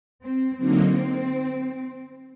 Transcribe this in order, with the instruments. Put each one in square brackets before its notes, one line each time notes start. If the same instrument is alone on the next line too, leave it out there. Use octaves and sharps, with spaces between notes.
[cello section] C4
[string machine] D3 F#3 A#3 D#4 [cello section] C4